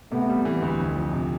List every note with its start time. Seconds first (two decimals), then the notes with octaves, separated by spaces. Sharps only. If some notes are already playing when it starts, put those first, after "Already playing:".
0.12 C3 A3 B3
0.29 G3
0.45 E3
0.62 D2
0.80 F2
0.96 F3
1.13 C3